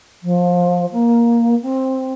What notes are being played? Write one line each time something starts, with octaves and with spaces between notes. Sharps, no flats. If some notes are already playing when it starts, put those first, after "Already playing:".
F3
A#3
C4